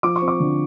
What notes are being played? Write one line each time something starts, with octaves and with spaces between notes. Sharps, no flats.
F3 D6
C#6
C4
D6
D3